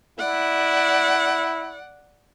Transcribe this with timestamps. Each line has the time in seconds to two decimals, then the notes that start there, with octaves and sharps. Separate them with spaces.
0.19 E4 D5 F#5